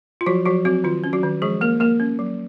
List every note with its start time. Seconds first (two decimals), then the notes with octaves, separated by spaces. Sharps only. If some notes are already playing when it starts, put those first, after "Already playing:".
0.21 F4
0.26 F3 F#3 F#4
0.46 F3 F#3 F#4
0.65 F#3 C4 F#4
0.84 D#3 F4
1.04 C#4
1.13 F#3 F#4
1.23 D#3
1.42 F3 G#3 G#4
1.61 A#3 A#4
1.80 A#3 A#4
2.00 C#4
2.19 F#3